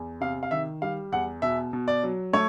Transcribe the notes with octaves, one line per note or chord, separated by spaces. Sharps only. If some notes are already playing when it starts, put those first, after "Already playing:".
Already playing: E2
C3 F5
F5
D#3 E5
G3 F5
E2 F#5
B2 E5
B2
D5
F#3
A3 C#5